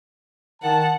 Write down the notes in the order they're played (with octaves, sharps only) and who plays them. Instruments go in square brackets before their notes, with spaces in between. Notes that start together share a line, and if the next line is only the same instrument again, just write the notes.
[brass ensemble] D#3 A5 [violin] F#5